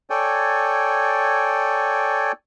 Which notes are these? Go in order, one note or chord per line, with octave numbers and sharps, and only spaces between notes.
A4 C#5 D5 G5 G#5